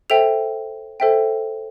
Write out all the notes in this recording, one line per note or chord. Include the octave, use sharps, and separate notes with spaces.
A4 C5 E5 G5 F7
A4 C5 E5 G5